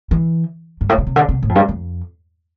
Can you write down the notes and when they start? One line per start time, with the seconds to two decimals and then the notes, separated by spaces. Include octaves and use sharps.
0.11 E3
0.81 G2
0.89 A2
0.98 B2
1.07 C3
1.16 D3
1.29 C3
1.43 A2
1.49 F2
1.55 G2
1.69 F2